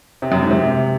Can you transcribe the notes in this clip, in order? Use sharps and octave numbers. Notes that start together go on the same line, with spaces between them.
C3
F#2
G#2
C3